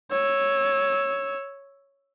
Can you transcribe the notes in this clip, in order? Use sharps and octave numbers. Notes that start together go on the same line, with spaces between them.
C#5 E6